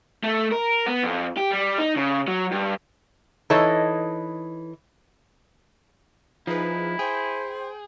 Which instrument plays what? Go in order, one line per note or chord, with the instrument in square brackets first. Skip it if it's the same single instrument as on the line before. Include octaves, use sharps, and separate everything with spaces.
[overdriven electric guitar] A3
A#4
B3
F2
G4
G3
D#4
C#3
F#3
G2
[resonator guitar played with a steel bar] E3 D#4 A4 C#5 D#5
[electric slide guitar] F3 [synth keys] D#4 G#4 B4 [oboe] E4
[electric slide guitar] G#4 [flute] C5 [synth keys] G5